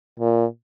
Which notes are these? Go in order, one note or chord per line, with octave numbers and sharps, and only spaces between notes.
A#2